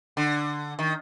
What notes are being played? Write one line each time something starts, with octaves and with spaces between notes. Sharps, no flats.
D3
D#3